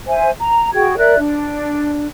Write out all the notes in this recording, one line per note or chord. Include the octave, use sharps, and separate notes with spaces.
C5 E5 G#5
A#5
F#4 G#4 G5 G#6
A#4 D5 E5 F#6
D4